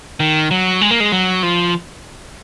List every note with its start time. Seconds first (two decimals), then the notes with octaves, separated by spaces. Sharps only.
0.20 D#3
0.51 F#3
0.81 G#3
0.91 A#3
1.00 G#3
1.12 F#3
1.43 F3